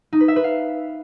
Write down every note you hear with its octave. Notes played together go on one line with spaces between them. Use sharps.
D#4
B4
E5
B4
F5